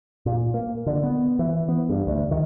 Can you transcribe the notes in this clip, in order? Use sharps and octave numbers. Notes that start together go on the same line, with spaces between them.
A#2
A#3
D3
B3
E3
B3
G2
D2
D#3